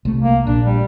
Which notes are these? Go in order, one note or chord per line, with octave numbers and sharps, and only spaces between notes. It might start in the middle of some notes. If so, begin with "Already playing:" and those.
C2 A3
A#3
A#1 D4
G3